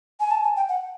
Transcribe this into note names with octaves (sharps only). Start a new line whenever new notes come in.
G#5
A5
G#5
G5
F#5